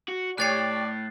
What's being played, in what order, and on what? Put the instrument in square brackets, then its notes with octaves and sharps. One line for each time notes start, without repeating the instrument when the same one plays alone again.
[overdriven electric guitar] F#4
[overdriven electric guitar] A2 [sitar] G4 C#5 [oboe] D5 [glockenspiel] F#6 A6 C7